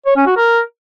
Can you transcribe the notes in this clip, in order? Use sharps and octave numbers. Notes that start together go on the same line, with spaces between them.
C#5
C#4
F#4
A#4